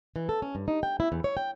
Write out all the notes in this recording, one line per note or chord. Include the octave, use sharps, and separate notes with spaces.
E3
A4
C#4
G2
D#4
G5
E4
E2
C#5
G5